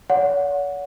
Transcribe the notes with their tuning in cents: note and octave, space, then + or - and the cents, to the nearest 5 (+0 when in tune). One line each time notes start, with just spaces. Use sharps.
C#5 +45 F#5 -20